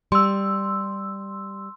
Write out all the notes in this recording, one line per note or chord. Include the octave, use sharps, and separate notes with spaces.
G3 C6 E6